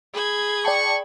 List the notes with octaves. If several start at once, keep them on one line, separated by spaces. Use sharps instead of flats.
G#4 B5 G#6
D5 G5 A5 C#6